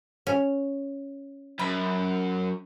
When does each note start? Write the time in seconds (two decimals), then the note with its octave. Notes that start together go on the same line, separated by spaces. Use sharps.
0.27 C#4
1.59 F#2 B5